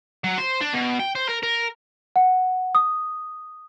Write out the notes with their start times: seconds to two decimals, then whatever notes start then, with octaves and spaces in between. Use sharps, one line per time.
0.24 F#3
0.38 C5
0.60 D4
0.73 B2
1.00 G5
1.15 C5
1.29 A#4
1.43 A#4
2.16 F#5
2.75 D#6